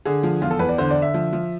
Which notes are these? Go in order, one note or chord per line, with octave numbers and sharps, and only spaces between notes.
D3 G#4
F3
E2 F4
A4
E2 B4
D5
D3 C5
D5
D3
E5
F3
F3